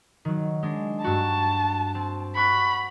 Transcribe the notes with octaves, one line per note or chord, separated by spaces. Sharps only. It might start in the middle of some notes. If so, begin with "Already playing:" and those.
D#3 F#3
G#3 D4
G2 F#4 A5 A#5
C4
F#5 B5 C#6 F#6